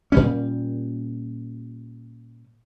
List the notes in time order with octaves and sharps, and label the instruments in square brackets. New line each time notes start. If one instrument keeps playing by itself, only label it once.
[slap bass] A#2 G3 C#4